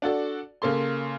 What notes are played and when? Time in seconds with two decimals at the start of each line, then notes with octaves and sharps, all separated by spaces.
0.02 D4 F#4 A4 D5
0.62 C#3 A#3 A4 C6